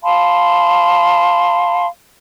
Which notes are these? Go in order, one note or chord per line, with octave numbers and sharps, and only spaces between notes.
F5 A5 B5 C6